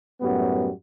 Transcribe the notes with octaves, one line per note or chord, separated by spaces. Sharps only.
F#2 A2 G3 B3 F#4